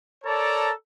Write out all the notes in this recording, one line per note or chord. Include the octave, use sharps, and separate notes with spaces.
A4 A#4 C#5 D5 A5 A#5